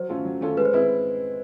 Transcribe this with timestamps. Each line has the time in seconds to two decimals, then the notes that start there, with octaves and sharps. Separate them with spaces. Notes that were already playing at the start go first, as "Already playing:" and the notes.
Already playing: F#3 C5
0.09 A3 C#4 F4 A4
0.25 F#3
0.41 A3 C#4 F4 A4
0.57 G#3 B4
0.65 C5
0.73 C4 E4 G#4 B4